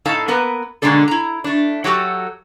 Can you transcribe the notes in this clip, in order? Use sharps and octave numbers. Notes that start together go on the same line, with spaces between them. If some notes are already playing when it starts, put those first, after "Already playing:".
A2 D#4 A4 F5 A5
A#3 B3 A#4 B4
B2 D3 G#3 A#3 D4 A4
E4 A#5
A3 D4
F#3 F#4 G4 A4